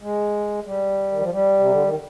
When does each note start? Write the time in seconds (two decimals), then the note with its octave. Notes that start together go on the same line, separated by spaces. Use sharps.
0.02 G#3
0.66 G3
1.12 D#3
1.21 F3
1.31 G3
1.59 C3
1.71 D3
1.84 D#3